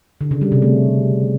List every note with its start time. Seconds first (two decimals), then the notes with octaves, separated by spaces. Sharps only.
0.21 D3
0.31 C#3
0.41 G3
0.52 C3
0.62 A3